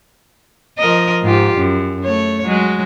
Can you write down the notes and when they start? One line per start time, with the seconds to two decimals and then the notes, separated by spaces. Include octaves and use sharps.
0.78 F3 A#4 D#5
1.23 G#2 F4 G4
1.58 F#2
2.04 A3 C#5
2.45 F#3 G#3